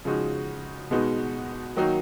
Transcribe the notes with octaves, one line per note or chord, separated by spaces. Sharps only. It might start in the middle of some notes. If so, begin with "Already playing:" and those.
C#3 F3 G#3 D#4 F#4
B2 G#3 B3 D#4 F#4
D#3 F#3 A#3 D#4 F#4